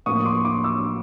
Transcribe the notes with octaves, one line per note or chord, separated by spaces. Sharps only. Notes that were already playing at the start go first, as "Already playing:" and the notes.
A2 F3 A#3 D4 C#6 D#6
C6 D6
C6 D6
D6 E6